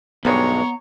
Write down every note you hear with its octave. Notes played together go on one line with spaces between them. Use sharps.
B1 G2 G#3 B3 C#5 A#5